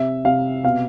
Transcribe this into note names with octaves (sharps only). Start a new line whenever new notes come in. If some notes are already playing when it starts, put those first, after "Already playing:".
Already playing: C3 E5
C3 F5
B2 F5